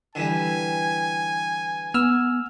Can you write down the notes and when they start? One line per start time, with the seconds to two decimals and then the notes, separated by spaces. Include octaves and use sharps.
0.15 D3 E3 G3 G#5
1.94 B3 E6 F6